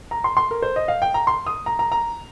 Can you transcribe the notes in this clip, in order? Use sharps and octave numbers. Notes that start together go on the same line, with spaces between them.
A#5
C6
C6
A#4
C5
D#5
F5
G5
A#5
C6
D#6
A#5
A#5
A#5